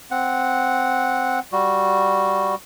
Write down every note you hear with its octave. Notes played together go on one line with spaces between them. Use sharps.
C4 F#5
G3 F#4